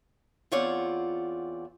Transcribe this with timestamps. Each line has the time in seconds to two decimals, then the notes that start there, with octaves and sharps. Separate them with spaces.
0.52 E2 C4 F4 C#5 D5 F#5